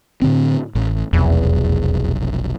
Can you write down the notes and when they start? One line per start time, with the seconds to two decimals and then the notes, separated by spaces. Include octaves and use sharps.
0.22 A2 D3 C4
0.75 A1
1.13 F1 B1 E2